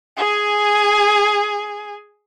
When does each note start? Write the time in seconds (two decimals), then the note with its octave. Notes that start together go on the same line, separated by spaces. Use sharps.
0.17 G#4 G#5